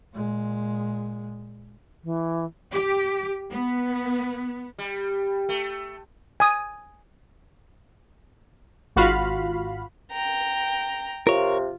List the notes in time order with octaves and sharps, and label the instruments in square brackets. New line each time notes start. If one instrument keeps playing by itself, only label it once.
[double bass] A#2 G#3
[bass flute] E3
[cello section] G4
B3
[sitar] G3
A3
[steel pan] G#5 D#6
[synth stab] G#1 G#2 F4 F#4 F5 B5
[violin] G5 A#5
[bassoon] C3 [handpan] F4 [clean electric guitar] A#4 C#5